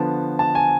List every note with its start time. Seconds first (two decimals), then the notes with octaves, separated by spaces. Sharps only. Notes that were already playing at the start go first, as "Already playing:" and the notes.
Already playing: D3 F3 B3 A5
0.39 A5
0.55 G#5